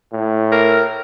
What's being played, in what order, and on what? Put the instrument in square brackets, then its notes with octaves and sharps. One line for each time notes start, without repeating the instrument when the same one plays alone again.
[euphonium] A2
[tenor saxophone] A#4